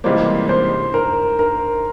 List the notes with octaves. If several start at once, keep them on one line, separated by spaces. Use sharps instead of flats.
C#2 C3 E3 G3 A#3 C5
C5
A#4
A#4